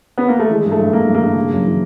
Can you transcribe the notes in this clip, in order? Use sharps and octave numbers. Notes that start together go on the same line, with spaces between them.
B3
A#3
A3
E3 G#3
G2 G#3
A3
G2
G2 A#3
G2
A#3
G2
C#3
F#2
E3